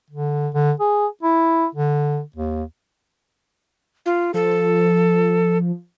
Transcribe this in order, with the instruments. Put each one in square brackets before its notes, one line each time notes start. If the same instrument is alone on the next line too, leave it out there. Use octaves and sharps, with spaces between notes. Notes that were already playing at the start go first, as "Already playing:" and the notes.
[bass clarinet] D3
D3
G#4
E4
D3
D#2
[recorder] F4
[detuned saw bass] F3 [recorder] A4